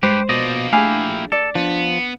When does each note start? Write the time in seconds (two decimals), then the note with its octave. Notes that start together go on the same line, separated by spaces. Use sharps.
0.03 G2 G#3 G4 B4 C5
0.29 B2 F3 A#3 D5 D#5 G6 A6
0.73 A3 D4 E4 G4 G#4 F5 G#5
1.32 A4 D5
1.55 F3 B3 D4 B4